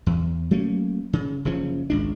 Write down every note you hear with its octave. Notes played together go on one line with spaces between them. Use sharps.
E2
F#3 A3 A#3 C#4
C#3
F#1 C#3 F3 C#4
G#1 C#2 D4